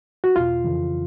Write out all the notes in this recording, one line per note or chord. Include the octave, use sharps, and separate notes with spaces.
F#4
E2 B2 F4
F2 C#3 E3